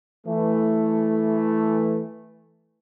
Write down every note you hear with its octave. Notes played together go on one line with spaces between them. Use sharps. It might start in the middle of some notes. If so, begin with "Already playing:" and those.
E3 A3